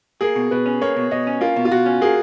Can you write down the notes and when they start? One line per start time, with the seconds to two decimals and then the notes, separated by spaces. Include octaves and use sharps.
0.21 A#3 G#4
0.36 B2
0.51 B2 B4
0.66 C#4
0.81 A#3 C#5
0.96 B2
1.11 B2 D#5
1.27 C#4
1.41 A#3 F4
1.56 B2
1.65 F4
1.71 B2 F#4
1.86 C#4
2.01 A#3 G#4